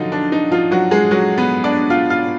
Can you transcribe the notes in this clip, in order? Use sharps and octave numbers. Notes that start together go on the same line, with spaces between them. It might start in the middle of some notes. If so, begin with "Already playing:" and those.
Already playing: D3 F3 F#3 D#4 F4 F#4
D4
D#4
F3 F4
F#3 F#4
G#3 G#4
F#3 F#4
B3 B4
D4 D5
F4 F5
F4 F5